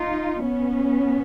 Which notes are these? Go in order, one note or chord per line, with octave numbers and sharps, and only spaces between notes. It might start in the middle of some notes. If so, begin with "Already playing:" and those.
Already playing: D#4 F4
B3 C#4